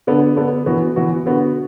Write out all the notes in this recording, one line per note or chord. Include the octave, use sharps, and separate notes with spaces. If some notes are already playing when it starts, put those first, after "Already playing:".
D3 B3 D4
D3 B3 D4
E3 B3 F#4
E3 B3 F#4
D3 B3 F#4